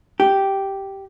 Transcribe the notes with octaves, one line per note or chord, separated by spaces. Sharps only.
G4